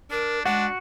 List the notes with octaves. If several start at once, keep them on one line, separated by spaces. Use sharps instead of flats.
D4 A#4
G#3 D4 F#4 F#5